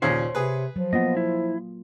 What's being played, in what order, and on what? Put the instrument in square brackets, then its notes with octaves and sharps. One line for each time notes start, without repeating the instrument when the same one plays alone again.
[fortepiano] D#2 C#3 [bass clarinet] A#2 [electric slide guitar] C5 C#5
[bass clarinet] C3 [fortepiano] G#4 B4
[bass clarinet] F3 [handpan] F#3
[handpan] A#3 F4 [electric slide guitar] B3 D#5
[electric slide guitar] E4